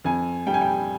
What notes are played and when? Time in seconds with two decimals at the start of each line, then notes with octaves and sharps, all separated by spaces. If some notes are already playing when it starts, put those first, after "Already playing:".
0.04 F2 G#5
0.47 G3 G5
0.54 G#5
0.61 G5